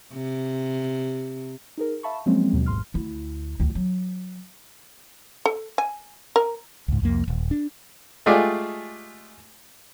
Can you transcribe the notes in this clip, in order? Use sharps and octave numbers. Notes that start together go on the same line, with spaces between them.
C3
D#4 G#4 A#4
E5 F5 A5 B5 C#6
F3 F#3 G#3 A#3 C4 C#4
D#2 B2 F#3
A1 G#2 C6 F6
D2 E4
D2 D#3
F#3
A4
G#5
A#4
C#2 G#2
C2 F2 A#3
D#1
D4
G#3 A3 F4 G4 G#4 D5